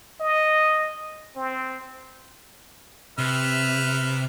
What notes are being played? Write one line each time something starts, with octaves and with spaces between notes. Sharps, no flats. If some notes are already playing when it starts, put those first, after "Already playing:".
D#5
C4
C3 B4 E5 F6